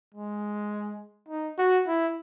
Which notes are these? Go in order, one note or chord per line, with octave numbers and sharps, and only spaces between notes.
G#3
D#4
F#4
E4